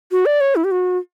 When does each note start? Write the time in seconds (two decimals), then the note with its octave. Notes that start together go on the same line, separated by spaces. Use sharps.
0.12 F#4
0.26 D5
0.41 C#5
0.56 E4
0.64 G4
0.71 F#4